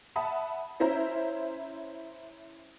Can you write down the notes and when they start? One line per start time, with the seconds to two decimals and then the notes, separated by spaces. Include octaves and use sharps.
0.16 E5 F#5 A5 B5 D#6
0.80 C#4 E4 C5 E5 A#5